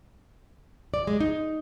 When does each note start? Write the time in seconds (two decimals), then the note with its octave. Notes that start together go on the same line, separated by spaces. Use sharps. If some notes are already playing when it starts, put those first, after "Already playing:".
0.94 D5
1.07 G#3
1.21 D#4